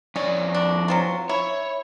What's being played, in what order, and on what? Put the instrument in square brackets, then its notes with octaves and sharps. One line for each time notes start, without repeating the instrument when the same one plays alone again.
[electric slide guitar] F2 D5 [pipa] C#4
[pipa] D4
F#3 C4 F4
[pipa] E4 [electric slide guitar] C#5